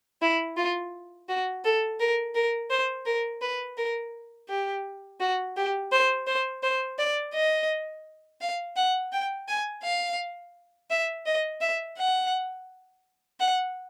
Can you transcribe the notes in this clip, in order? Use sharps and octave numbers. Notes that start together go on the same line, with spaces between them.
E4
F4
F#4
A4
A#4
A#4
C5
A#4
B4
A#4
G4
F#4
G4
C5
C5
C5
D5
D#5
F5
F#5
G5
G#5
F5
E5
D#5
E5
F#5
F#5